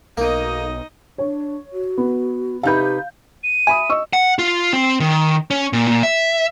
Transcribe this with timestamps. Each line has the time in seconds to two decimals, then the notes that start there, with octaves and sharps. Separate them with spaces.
0.17 B1 A#3 D#4 D#5
1.18 D4 C#5
1.73 F#4
1.98 B3
2.63 C3 D#4 G4 B4 F5 G6
3.44 D#7
3.67 E5 G#5 B5 D#6
3.90 D#5 C#6 E6
4.13 F#5
4.39 F4
4.73 C4
5.00 D#3
5.50 C#4
5.73 A#2
5.87 A#2
6.03 E5